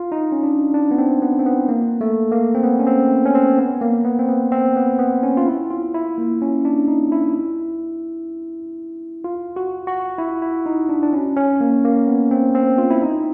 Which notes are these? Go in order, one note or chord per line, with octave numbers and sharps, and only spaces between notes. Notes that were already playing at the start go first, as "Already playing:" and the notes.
Already playing: F4
D#4
C#4
D4
D4
B3
C4
B3
C4
B3
A#3
A3
A#3
C4
B3
C#4
C4
C#4
C4
B3
A#3
B3
C4
B3
C4
B3
B3
C#4
F4
E4
F4
E4
A#3
C#4
D4
D#4
E4
F4
F#4
F#4
E4
E4
D#4
D4
D4
C#4
C#4
A#3
A#3
B3
C4
C4
F4
E4
D#4